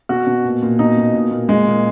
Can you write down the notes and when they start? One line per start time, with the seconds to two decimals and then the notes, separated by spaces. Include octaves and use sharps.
0.09 B2 F#4
0.27 B2
0.45 A#2
0.63 A#2
0.79 B2 D#4
0.97 B2
1.14 A#2
1.31 A#2
1.49 A#2 G#3
1.67 A#2